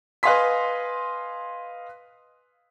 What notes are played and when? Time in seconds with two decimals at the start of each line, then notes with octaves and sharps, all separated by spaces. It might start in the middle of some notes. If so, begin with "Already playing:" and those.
0.23 B4 D#5 F5 G#5 C6 B6